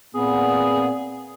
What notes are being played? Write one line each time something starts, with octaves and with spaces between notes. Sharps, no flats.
A#2 B3 C4 G#4